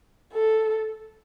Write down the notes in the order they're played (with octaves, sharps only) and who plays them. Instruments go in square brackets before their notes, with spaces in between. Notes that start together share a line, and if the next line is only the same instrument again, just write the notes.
[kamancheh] A4